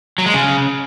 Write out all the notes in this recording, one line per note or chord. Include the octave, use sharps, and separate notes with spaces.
F#3
G#3
C#3